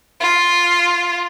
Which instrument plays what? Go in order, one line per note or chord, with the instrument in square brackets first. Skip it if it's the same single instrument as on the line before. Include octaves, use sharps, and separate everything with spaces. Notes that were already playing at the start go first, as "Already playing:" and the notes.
[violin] F4